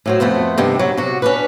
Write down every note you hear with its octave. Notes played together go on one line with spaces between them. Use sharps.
A2 F#3 C5
F2 A3 B3 C5
G2 C3 D#3
F#3
C3 F#4
C#4 D4 B4